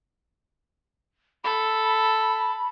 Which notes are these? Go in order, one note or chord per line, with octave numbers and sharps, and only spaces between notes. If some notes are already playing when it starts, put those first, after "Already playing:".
A4 B5